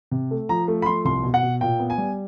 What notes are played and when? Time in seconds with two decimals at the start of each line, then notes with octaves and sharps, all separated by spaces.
0.11 C3
0.31 A3
0.49 F3 A#5
0.68 A3
0.82 B5
0.86 F3 C6
1.05 C2 C6
1.23 B2
1.34 F#5
1.43 B2
1.61 A#2 G5
1.80 B3
1.90 G#5
1.98 G3